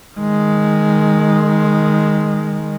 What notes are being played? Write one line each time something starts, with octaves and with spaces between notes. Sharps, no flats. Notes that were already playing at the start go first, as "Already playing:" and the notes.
D#3 G#3